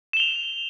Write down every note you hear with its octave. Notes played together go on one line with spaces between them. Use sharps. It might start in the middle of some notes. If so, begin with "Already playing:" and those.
E7 F7 G7